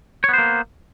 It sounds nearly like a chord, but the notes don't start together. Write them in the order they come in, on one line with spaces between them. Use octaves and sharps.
C#5 B3 C5 A#3